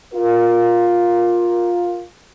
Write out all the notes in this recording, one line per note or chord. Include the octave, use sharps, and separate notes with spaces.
F4 A#4